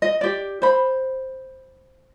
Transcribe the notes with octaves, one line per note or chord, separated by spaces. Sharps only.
D#5
G4 D5
C5 B5